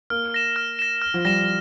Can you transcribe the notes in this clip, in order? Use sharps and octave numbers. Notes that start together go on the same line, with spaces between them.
A#3 F6
A#6 E7
F6
A#6 E7
F6
F3
G3 A#6 E7